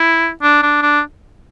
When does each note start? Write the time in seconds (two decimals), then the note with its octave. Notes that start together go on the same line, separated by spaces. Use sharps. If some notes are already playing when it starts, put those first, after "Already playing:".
Already playing: E4
0.43 D4
0.63 D4
0.82 D4